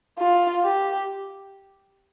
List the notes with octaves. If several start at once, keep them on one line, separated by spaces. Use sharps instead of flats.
F4
G4